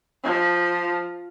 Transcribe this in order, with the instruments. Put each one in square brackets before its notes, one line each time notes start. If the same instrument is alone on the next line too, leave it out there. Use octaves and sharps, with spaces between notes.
[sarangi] F3